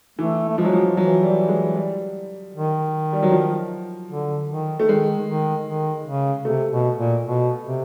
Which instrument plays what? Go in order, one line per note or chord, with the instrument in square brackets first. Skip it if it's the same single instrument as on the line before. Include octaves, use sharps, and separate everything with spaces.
[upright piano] E3 [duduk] A3
[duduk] A3
[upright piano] F3 [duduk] G#3
[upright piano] F#3
F3
[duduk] E3 [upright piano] F#3
[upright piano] G3
G#3
G3
[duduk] D#3
[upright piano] G3
F#3
F3
[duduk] D3
D#3
[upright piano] A3
[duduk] D#3 [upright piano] G#3
[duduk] D#3
D#3
C#3
[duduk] C3 [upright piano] A3
[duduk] B2
A#2
B2
C3